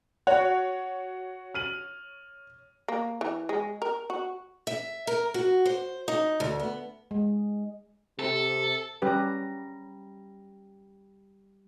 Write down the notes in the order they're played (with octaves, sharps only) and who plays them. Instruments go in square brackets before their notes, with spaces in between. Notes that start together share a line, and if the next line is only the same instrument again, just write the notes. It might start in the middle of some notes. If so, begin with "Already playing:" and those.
[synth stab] F#4 [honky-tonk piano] C#5 [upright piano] F#5 C#6
[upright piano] F6 D#7 F#7
[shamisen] A#3
E3
G#3
A#4
F#4
[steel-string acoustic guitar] E5
A#4
F#4
C5
D#4
D2
B3
[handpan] G#3
[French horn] C3 [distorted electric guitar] A4
[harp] G3 A#5 [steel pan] C#4 G4 B4